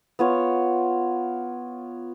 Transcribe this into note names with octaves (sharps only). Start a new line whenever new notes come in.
B3 F4 C#5